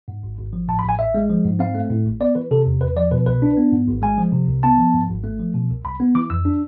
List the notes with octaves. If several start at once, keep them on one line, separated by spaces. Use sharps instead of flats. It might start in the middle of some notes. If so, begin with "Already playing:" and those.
G#2
G#1
G#1
F3
A2 A5
B5
A1
G#5
A1 E5
G#3
F3
G#2
C4 F5
A3
A2
A1
B3 D5
E3 B4
C3 A4
E2
E2 B4
F3 D5
B2 B4
C2 B4
D4
B3
G#2
G#1
G#3 G#5
F3
C3
C2
B3 A5
F3
G#2
G#1
A3
F3
B2
C2
C2 B5
B3
E3 D6
F2 E6
D4